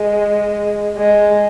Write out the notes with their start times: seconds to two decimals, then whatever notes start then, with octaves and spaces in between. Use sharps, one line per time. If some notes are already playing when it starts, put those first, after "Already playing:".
Already playing: G#3
0.98 G#3